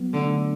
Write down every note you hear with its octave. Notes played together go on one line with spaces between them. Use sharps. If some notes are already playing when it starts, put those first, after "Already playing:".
Already playing: F#3 B3
D3 A3